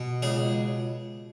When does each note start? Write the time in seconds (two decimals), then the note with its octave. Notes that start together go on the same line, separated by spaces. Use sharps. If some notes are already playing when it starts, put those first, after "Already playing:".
Already playing: B2
0.22 C#2 G#4